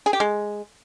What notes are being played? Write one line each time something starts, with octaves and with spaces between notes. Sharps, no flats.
G#4
G4
G#3